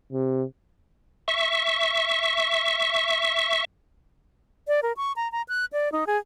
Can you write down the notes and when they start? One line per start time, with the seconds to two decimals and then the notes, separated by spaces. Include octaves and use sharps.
0.12 C3
1.28 E5 C#6
4.68 D5
4.83 A#4
4.97 C#6
5.16 A#5
5.32 A#5
5.48 F#6
5.73 D5
5.92 D#4
6.07 G#4